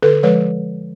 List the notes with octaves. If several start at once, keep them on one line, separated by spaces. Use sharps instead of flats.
D3 A4 B4
F3 G#3 B4 C#5